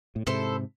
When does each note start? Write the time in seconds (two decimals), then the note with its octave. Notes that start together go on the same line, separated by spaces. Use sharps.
0.16 A2
0.27 G#2 C3 E4 A4 C5